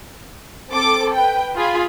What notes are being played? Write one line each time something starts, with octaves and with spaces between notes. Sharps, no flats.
C4 A4 D6
B4 G5
F4 G#4 B5